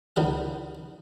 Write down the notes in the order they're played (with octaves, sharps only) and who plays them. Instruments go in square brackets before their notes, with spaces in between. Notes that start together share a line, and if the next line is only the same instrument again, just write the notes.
[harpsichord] C#2 D#3 G3 F#5